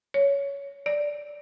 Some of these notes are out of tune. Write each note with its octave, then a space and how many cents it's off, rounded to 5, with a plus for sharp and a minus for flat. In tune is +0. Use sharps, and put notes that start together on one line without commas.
C#5 +15
D5 +0